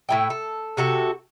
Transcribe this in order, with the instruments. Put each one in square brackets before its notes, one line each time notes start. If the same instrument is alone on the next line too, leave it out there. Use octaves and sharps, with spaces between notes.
[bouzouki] A2 E4 G5
A4
C3 F#4 A4